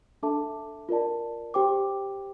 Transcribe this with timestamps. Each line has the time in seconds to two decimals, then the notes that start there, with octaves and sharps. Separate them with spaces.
0.23 D4 A4 E5 A5 D6
0.89 F4 A#4 D5 A5
1.54 G4 C5 G5 D6